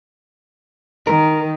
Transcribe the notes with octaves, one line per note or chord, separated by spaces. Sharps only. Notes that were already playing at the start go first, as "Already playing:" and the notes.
D#3 A#4